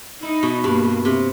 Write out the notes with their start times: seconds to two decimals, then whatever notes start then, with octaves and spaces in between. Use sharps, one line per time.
0.22 D#4 E4
0.43 B2
0.64 G2 A#3
0.84 G2
1.05 C3